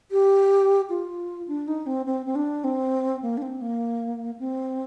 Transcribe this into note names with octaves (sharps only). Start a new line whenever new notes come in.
G4
F4
D4
D#4
C4
C4
C4
D4
C4
A#3
D4
C4
A#3
C4